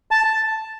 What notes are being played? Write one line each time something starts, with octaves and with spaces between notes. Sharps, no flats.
A5